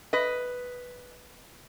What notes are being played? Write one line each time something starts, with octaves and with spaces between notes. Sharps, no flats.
B4 D#5